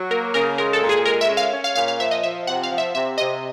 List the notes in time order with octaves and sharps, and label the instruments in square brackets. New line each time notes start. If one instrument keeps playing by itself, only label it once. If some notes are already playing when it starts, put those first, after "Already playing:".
Already playing: [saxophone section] F#3
[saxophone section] A#3 [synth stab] A#4
[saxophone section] C#3 [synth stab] A#4
[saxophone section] G#3 [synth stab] A#4
[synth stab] A4
[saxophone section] A#2
[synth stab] G#4
[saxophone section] G#3 [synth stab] A#4
[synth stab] E5
[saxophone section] C#4
[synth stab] F5
[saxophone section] C#4
[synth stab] F5
[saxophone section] A#2 [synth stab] F5
[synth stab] F5
[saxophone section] F3 [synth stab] E5
[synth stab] D#5
[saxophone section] F3 [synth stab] E5
[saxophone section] C3 [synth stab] F#5
[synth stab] F5
[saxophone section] F3
[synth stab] E5
[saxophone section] C3 [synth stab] E5
[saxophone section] C3 [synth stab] D#5